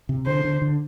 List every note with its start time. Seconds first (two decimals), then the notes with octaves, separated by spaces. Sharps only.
0.09 C3
0.26 D3 C5
0.45 D3
0.62 D3